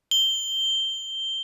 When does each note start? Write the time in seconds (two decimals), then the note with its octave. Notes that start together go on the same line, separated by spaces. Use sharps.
0.11 G7